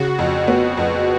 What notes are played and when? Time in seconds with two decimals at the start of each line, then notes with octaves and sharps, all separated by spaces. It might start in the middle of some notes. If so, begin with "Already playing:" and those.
Already playing: C#3 F#4
0.19 F2
0.47 B3
0.77 F2